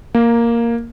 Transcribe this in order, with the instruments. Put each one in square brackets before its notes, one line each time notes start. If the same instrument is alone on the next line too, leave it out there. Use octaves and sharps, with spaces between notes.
[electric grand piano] A#3